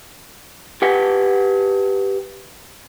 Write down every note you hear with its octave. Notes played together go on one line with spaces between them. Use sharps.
G4 B4 F#5 G5